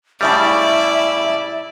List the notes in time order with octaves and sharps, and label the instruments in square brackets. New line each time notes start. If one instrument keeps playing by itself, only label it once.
[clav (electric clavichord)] A2 C#3 G3 [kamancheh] E4 [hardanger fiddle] D5 [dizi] E5